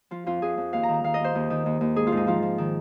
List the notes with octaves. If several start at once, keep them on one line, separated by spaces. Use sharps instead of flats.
F3 F4
F2 F4
F2 G#4
F2
D#2 F5
A#5
D#3
A#5
D#3 F5
D#5
D#2 C5
D#2
D#3
D#2
D#2
G#2 G#4
F4
G#2 D#4
F3 F4
F3
D#3